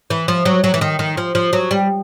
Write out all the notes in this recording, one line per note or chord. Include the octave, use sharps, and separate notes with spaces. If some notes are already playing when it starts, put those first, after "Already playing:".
E3
F3
F#3
F#3
E3
D#3
D#3
F3
F3
F#3
G3